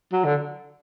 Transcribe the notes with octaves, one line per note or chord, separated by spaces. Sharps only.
F#3
D3